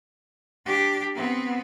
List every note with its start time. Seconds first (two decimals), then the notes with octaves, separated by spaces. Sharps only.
0.66 D4 G4
1.15 B3 C4